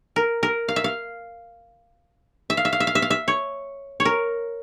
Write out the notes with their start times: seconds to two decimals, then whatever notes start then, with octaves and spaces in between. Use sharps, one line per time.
0.16 A#4
0.43 A#4
0.68 F5
0.76 E5
0.84 F5
2.50 E5
2.57 F5
2.65 E5
2.73 F5
2.80 E5
2.87 F5
2.95 E5
3.02 F5
3.10 E5
3.28 C#5
4.00 C#5
4.05 A#4